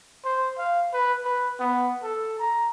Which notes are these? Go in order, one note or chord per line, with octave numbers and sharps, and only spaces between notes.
C5
F5
B4
B4
B3
A4
A#5